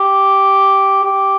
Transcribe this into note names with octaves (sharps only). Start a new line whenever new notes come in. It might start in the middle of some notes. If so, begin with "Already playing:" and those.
Already playing: G4
G4